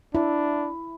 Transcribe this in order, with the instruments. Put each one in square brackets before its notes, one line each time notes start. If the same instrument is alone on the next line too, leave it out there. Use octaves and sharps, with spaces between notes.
[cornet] D4 [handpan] E4